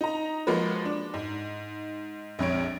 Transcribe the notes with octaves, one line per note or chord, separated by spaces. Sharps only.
D#4 A#5
F3 G#3 A#3 F#4 B4
D4
G#2
A#1 F2 C#5 D7